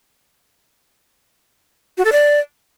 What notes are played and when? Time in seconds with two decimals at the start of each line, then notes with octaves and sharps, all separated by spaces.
1.97 F#4
2.05 A4
2.12 D5